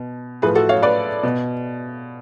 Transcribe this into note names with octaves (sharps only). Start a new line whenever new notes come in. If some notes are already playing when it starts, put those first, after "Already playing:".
Already playing: B2
A2 F3 G#4 B4
F#4 A4
C#5 F5
B4 D5
B2